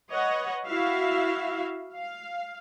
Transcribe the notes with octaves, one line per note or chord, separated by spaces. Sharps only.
B4 C#5 D#5 F#5
E4 F#4 E5 F5
F5